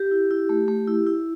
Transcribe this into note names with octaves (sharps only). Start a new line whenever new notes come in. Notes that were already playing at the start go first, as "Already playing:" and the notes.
Already playing: G4
E4
E4
A3
A3
E4
E4